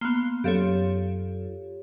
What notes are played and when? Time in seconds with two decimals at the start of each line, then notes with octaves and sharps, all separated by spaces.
0.01 A#3 B3 F5 C6
0.44 F#2 F4 G4 A4 C#5